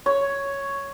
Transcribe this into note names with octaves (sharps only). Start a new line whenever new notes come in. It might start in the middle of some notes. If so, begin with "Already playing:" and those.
C#5